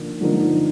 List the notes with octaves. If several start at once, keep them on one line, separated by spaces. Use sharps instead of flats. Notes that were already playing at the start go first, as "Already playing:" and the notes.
Already playing: D3 F3 A#3 D#4
D3 F3 A#3 D#4